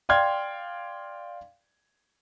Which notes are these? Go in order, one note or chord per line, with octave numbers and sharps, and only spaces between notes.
D5 F5 G5 C6 F6 G#6